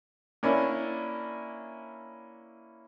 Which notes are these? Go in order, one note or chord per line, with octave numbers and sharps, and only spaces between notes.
A#3 C#4 D4 E4